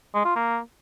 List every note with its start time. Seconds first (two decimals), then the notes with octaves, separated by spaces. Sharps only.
0.15 G#3
0.25 F4
0.36 A#3